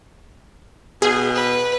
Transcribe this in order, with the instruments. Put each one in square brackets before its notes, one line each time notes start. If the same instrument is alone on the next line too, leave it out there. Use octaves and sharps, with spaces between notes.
[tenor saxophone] B2 [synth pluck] G#4
[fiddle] B4